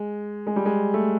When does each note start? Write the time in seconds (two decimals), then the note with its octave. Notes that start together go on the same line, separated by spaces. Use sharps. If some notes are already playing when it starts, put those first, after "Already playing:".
Already playing: G#3
0.47 G#3
0.56 G3
0.66 G#3
0.94 A3